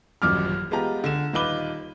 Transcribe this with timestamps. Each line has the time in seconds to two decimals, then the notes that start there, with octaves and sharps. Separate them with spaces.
0.22 D#1 A1 F#2 D6 F6
0.71 G#3 B3 F4 G4 A#5
1.04 D3 E7
1.33 D#1 D#4 F4 B4 D6 G7